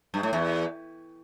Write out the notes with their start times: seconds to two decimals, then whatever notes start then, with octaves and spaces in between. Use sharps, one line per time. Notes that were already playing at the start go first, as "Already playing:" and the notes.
0.14 G2
0.23 A2
0.33 E2